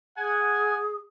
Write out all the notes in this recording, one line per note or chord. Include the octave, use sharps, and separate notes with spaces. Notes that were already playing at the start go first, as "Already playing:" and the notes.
G#4 F#5 G#5